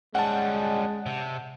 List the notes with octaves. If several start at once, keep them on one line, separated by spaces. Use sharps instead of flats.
G3 G#3 C#4 F#5 A5
C3